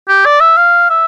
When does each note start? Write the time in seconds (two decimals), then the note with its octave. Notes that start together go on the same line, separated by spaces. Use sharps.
0.08 G4
0.26 D5
0.40 E5
0.57 F5
0.90 E5